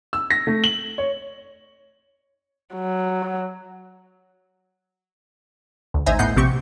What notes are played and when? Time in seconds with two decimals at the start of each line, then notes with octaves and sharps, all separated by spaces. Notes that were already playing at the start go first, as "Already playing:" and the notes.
0.13 E6
0.30 A#6
0.47 A3
0.64 F#7
0.98 C#5
2.74 F#3
5.94 D2
6.06 A1 D#4 C5 E5 G#5 A#5
6.19 A2 B3 D#5 F#5 G6 C7
6.36 A#1 C3 C4 G4 C#6